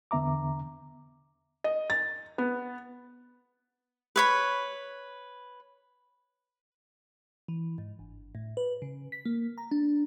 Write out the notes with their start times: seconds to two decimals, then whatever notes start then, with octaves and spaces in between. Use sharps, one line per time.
0.11 E2 D3 B3 E5 A#5 D6
1.64 D#5
1.90 A6
2.38 B3
4.16 B4 C#5 B5
7.48 E3
7.78 G#2
7.99 G1
8.35 A2
8.57 B4
8.82 C#3
9.12 B6
9.25 A#3
9.58 A#5
9.71 D4